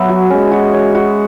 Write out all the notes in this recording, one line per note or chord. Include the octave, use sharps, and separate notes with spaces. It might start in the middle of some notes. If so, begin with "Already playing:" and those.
Already playing: F#3 B3 E5
F#4
G#3 C#4
F#4
C#5
F#4